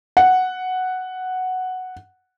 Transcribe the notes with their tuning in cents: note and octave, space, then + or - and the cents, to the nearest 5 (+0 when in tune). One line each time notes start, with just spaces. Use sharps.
F#5 +0